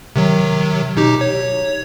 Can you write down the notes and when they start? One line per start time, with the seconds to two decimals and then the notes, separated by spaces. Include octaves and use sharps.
0.16 C3 D#3 F#3
0.97 B2 D#4 G4
1.21 C#5